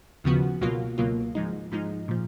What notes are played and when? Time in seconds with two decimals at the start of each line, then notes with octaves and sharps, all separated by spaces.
0.24 D#2 C#3 F3 B3 F#4
0.61 C#2 B2 F#3 A#3 F4
0.98 C#2 B2 F#3 A#3 F4
1.35 G#2 F3 G#3 D#4
1.71 G#2 F3 G#3 D#4
2.08 A#2 F3